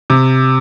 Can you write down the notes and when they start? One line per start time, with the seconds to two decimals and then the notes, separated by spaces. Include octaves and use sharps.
0.10 C3